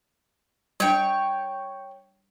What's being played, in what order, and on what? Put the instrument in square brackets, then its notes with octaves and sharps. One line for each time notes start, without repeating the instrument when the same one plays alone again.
[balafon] G3 D4 [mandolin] C#5 G5